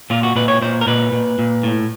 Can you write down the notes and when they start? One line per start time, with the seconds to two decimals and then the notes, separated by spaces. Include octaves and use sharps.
0.10 A#2 F4
0.23 F#4
0.36 A#2 B4
0.48 C#5
0.62 A#2 C5
0.81 A#4
0.87 A#2 B4
1.12 A#2
1.39 A#2
1.63 A2